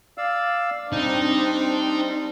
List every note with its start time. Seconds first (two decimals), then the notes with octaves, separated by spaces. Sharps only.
0.18 D5 F5 E6
0.92 G3 C4 D4 D#4